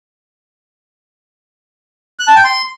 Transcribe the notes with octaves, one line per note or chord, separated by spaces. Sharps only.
F#6
A5
G5
C6